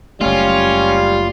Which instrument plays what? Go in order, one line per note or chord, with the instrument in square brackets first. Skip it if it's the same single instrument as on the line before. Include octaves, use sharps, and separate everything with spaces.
[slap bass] F#1 A3 [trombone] G3 [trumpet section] C#4 [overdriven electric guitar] F4